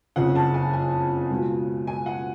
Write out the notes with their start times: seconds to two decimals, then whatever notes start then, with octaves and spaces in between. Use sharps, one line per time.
0.16 F#1 F2 C#3 F#5
0.35 A5
0.54 G#5
0.73 G#5
1.30 C#2 B2
1.87 G#5
2.06 F#5